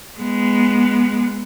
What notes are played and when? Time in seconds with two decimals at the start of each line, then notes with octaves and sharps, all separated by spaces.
0.19 G#3 B3